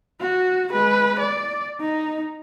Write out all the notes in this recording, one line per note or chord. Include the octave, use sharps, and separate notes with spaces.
F#4
G#3 B4
D5
D#4